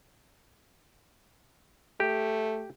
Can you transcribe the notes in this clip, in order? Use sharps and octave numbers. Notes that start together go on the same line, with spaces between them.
A3 G4